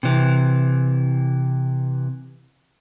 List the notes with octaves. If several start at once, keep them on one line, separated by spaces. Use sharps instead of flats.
C3 E3